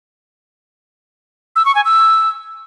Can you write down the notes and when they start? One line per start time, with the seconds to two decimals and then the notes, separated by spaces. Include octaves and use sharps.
1.56 E6
1.65 C#6
1.75 G#5
1.85 E6